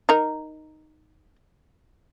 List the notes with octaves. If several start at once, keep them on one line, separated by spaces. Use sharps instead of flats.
D#4 A#4